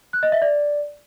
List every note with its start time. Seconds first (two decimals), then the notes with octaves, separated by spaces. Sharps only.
0.13 F#6
0.23 D#5
0.32 E5
0.42 D5